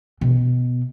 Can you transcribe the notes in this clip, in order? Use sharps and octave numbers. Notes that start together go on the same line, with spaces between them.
B2